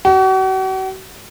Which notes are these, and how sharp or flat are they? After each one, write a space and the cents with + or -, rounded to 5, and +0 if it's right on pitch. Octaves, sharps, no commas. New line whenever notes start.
F#4 +40